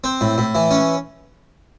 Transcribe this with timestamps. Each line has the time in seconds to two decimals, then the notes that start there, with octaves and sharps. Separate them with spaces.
0.04 C4
0.21 A2
0.38 A2
0.55 E3
0.71 C#4